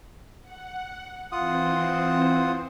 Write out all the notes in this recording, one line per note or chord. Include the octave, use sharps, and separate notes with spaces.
F#5
E3 C4 F4 C5 F#5 D#6